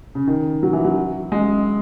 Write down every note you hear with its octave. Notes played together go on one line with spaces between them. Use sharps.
C#3
D#3
F#3
E3
F#3
G#3